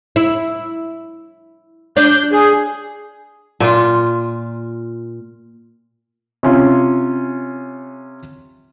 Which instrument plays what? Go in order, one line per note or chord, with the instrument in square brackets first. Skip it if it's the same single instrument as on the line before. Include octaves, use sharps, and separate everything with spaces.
[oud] E4
[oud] D4 D5 [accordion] G6
[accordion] G#4
[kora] A#2 F4
[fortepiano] C3 C#4 F4